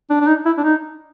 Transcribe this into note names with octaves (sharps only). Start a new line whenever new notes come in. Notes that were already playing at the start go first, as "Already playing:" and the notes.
D4
D4
D#4
E4
D4
D#4